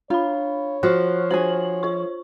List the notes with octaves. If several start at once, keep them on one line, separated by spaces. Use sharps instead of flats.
D4 F4 C#5 B5
F3 F#4 C#6 F6 F#6
D4 F#4 G#4 C5 F#7
F4 C5 C#6